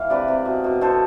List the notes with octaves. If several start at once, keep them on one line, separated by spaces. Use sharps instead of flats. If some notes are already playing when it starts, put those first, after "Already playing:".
Already playing: E3 G#3 F5
C3 B4 D5
C3
B2
B2
B2 A4 C5